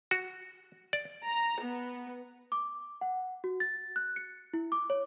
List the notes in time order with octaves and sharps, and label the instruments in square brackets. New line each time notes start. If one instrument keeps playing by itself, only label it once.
[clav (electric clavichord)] F#4
D5
[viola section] A#5
B3
[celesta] D6
F#5
F#4
A6
F#6
C#7
E4
D6
C#5